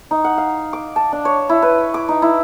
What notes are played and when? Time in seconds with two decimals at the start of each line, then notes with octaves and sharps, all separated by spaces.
0.11 D#4
0.24 F#5
0.38 F5
0.73 D6
0.96 A5
1.12 D4
1.25 C#5
1.49 E4
1.62 B4
1.94 D6
2.09 D#4
2.22 E4